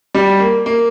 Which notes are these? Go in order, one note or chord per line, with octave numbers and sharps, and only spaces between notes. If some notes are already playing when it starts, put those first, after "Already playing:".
G3
A#3
A#3